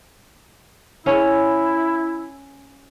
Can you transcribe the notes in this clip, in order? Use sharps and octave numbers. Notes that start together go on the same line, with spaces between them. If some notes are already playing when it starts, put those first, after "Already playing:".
C#4 E4